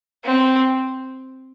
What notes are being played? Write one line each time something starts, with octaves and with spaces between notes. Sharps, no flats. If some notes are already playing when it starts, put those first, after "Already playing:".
C4